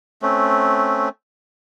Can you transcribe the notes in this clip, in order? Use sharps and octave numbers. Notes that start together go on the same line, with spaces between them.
A3 C4 C#4